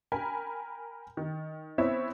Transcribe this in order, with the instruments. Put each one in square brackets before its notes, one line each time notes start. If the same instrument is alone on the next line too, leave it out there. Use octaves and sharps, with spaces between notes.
[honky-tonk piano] A#4 G5 G#5 B5
D#3
B3 C4 E4 C#5 E5